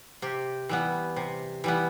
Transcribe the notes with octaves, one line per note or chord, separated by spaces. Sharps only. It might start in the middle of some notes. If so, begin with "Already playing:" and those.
C3 G4
E3 G3 B3
C3
E3 G3 B3